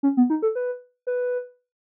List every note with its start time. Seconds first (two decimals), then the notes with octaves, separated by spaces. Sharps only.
0.03 C#4
0.17 B3
0.30 D#4
0.42 A4
0.55 B4
1.07 B4